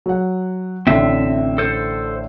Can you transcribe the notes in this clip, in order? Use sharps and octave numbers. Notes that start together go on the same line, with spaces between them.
F#3 F#5
A1 A2 D3 C4 E5
A4 C5